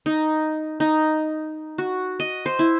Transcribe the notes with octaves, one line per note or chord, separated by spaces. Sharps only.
D#4
D#4
F#4
D#5
C5
E4